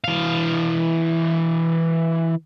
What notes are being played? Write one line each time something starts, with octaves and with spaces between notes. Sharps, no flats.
E3 F5